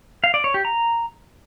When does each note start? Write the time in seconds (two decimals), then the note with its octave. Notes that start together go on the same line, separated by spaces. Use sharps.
0.24 F5
0.34 D5
0.44 C#5
0.54 G4
0.65 A#5